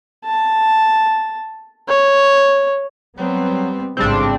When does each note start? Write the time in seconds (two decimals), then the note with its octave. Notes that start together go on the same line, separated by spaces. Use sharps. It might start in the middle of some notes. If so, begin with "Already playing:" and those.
0.25 A5
1.89 C#5
3.17 F#3 G3 B3 C4
3.97 A1 G#2 C#3 G3 C4 D4